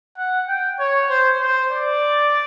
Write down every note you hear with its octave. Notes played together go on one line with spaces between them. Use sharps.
F#5
G5
C#5
C5
C5
D5